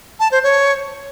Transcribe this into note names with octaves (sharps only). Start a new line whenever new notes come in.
A5
C5
C#5